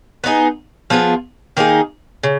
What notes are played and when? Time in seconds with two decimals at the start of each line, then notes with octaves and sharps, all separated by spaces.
0.24 B3 D#4 G#4
0.90 F3 B3 F4 G#4
1.57 D#3 A#3 D#4 G#4
2.23 C#3